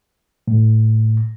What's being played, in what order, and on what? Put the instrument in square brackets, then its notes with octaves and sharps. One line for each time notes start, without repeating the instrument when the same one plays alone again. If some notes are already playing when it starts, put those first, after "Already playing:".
[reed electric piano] A2